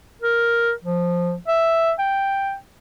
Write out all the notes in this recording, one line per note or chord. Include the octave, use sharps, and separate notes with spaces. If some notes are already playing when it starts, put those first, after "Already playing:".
A#4
F3
E5
G5